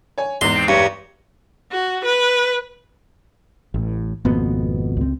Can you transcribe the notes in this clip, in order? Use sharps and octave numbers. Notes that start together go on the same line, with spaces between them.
C#5 G#5
E2 G#2 C6
C4
G2 C#5
F#4
B4
A1 A2
G#1 F2 B2 A#3 B3
C#2 C4